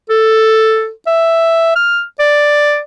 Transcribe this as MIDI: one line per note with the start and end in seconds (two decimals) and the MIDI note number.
0.10 0.90 69
1.07 1.76 76
1.76 2.03 89
2.19 2.80 74